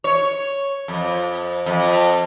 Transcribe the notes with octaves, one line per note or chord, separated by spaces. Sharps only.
C#5
F2
F2